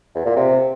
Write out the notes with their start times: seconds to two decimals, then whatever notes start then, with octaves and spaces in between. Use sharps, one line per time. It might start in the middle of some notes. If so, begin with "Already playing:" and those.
0.15 E2
0.26 A#2
0.36 C3